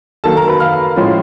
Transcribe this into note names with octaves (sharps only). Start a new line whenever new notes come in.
D#3 F#3 A#3 A4 A5
A#4 A#5
B4 B5
F5 F6
A2 F3 G#3 C#4 F4